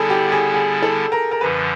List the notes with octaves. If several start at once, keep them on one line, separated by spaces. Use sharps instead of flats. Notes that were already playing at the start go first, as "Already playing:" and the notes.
Already playing: D3 G3 B3 E4 G#4 A4
G4
G#4
G#4
A4
A#4
A#4
F#2 D3 F3 B4